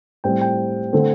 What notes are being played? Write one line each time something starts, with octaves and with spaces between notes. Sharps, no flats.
A2 G3 C4 G5
G5
D3 A3 C4